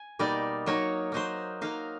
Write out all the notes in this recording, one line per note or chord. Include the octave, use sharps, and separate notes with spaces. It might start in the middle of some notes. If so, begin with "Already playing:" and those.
Already playing: G#5
B2 G3 A#3 D#4 D5
F#3 A#3 D#4 C#5
F#3 A#3 D#4 C5
F#3 A#3 D#4 F5